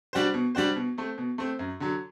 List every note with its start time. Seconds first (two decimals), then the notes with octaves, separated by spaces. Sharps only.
0.13 G3 D4 F#4 C5
0.34 B2
0.55 G3 D4 F#4 C5
0.76 B2
0.98 A3 C4
1.18 B2
1.38 A3 C4
1.59 F#2
1.80 D3 F#3